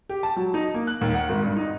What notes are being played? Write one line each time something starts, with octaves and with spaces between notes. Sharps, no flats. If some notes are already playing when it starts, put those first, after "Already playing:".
G4
A5
F#3
D#4
A#3
F#6
D#2
F#5
G#1
G2
D#4